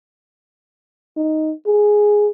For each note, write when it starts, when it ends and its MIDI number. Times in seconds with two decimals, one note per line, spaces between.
1.17 1.52 63
1.66 2.29 68